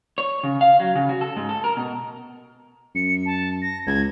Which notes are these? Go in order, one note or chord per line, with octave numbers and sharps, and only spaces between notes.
C#5
C#3
F5
F#3
C#3
F#4
A4
G#2
A4
A#4
B2
F#2 C#7
A5
A#6
C#2 G#6